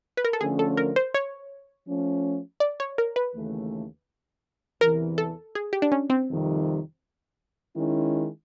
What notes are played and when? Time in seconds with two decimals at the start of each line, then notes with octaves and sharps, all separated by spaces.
0.17 B4
0.25 A#4
0.33 A4
0.41 D3 F3 A3 C#4 G#4
0.59 A4
0.77 A#4
0.96 C5
1.14 C#5
1.87 F3 A3 C#4
2.60 D5
2.80 C#5
2.98 A#4
3.16 B4
3.34 D#2 C#3 E3 A3
4.81 E2 C3 E3 A#4
5.18 A4
5.55 G#4
5.73 G4
5.82 D4
5.92 C#4
6.10 C4
6.28 F2 C3 D#3 G3
7.75 D#3 G#3 C#4 E4